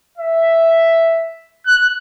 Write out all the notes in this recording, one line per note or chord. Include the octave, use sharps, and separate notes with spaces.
E5
F#6